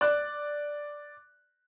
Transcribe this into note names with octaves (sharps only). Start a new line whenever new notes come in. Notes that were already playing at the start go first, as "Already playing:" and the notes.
D5 F#6